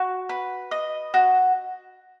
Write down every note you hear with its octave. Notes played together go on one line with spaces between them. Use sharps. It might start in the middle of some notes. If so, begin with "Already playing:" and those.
Already playing: F#4
B4
D#5
F#4